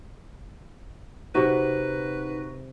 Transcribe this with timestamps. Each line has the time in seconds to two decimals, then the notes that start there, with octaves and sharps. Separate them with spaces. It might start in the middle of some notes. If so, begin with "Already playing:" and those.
1.35 C3 D#4 F#4 B4 E5